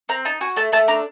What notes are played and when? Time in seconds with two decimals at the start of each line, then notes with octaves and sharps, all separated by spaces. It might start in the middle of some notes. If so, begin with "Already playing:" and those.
0.09 C4 A#5
0.25 D#4 A5
0.41 F#4 G#5
0.56 A3 A5
0.72 A3 A5
0.88 D4 A#5